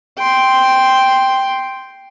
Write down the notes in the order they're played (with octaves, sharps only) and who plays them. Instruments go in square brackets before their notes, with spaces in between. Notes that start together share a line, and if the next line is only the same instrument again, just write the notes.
[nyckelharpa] G5 C6